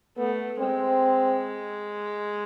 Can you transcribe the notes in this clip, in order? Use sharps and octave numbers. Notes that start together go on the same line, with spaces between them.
A3 B3
G#3 C4